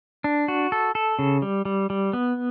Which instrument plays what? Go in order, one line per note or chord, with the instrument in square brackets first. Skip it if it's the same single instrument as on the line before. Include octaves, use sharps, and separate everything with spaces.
[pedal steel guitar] D4
F#4
A4
A4
C#3
G3
G3
G3
B3